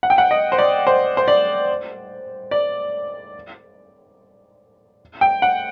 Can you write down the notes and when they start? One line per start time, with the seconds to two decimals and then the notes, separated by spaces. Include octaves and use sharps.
0.03 F#5
0.10 G5
0.18 F#5
0.31 D#5
0.52 C5
0.58 D5
0.87 C5
1.17 C5
1.28 D5
2.51 D5
5.21 G5
5.42 F#5